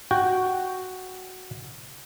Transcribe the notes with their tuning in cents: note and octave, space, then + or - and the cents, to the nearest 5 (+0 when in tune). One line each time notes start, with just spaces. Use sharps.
F#4 +0 G5 -10